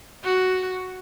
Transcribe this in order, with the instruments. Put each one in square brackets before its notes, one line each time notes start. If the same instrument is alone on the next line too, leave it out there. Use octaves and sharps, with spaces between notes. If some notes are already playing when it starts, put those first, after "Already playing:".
[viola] F#4